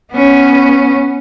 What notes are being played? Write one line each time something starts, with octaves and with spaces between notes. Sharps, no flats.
B3 C#4